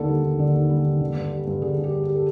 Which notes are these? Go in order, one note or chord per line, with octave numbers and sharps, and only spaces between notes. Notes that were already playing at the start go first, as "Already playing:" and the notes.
Already playing: D#2 D3 A4
G3
D#2
D3
D#2
G3
D#2
D3
G2
G3
G2
D3 G#4
G2
G4
G3
G4
A4